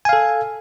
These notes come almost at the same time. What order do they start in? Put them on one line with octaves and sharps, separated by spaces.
G#5 F5 A4